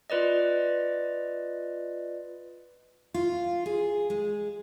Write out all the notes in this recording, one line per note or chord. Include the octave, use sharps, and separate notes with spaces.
F4 B4 D5 D#5
F4
G#4
G#3